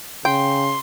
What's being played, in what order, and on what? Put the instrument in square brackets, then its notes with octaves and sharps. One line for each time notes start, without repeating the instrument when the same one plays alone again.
[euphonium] C#3 [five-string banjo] G5 [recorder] C6